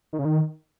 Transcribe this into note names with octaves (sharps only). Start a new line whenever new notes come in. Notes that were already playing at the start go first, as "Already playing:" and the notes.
D#3
C#3
D#3